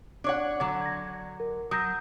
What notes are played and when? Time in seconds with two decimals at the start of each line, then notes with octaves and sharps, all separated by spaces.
0.24 D4 C#5 F#5
0.60 D3 F#3 F#5
0.81 G#6 A#6
1.40 A#4
1.71 F#3 D#6 G6 A#6